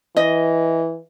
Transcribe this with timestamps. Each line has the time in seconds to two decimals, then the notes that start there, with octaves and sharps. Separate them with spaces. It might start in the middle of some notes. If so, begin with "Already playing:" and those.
0.17 E3 D#5